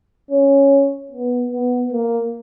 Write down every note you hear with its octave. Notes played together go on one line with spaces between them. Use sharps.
C#4
B3
B3
A#3